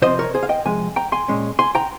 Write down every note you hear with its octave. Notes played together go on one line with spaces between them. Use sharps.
C3 F3 C4 C5 D#5
A#4 C#5
G#4 C5
F5
D#5 G5
C3 F3 G#3 G#5
G5 A#5
G#5 C6
A#2 G#3 C#4
G#5 C6
G5 A#5